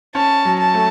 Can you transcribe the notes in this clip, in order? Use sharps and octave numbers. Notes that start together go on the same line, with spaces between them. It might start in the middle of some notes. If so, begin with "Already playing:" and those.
C#4 A5
F#3
A5
A3